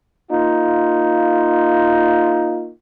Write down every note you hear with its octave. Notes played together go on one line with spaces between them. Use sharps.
A#3 D#4 F4